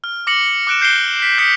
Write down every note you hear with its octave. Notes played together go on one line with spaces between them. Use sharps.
F6
D6 A#6 C#7 F#7
D6 F6 F#6 D7 E7
G6 C7 D7 G7
B6
D#6 G6 B6 C#7